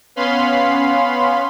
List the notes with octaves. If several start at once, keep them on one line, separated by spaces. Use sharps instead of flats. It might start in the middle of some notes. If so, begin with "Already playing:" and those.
B3 C#4 F5 B5 C6